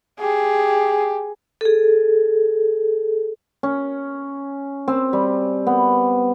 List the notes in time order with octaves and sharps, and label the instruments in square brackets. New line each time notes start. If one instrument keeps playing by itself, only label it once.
[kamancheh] G4 [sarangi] G#4
[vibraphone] G#4 A4
[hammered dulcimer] C#4
C4
G3
B3